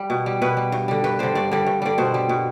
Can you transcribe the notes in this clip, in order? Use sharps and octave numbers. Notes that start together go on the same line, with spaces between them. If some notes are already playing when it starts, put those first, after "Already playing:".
Already playing: G3
B2
G3
B2 B4
G3
G2
D3 G3
G2 B4
D3 G3 C5
G2 D5
D3 G3
G2
D3 G3 D5
B2 C5
G3
B2